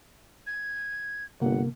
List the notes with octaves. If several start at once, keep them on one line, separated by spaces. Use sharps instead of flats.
G#6
G1 C3 A#3 F#5